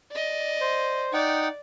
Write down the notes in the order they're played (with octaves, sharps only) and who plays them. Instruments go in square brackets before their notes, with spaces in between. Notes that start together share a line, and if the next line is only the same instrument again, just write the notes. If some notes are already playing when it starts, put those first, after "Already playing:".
[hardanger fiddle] D5 D#5
[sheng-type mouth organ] C5
[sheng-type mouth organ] D#4 F#5 G5 [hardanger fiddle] D5